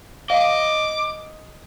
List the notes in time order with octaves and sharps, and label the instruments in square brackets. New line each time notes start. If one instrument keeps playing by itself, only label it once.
[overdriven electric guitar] D#5 [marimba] F5 [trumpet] D6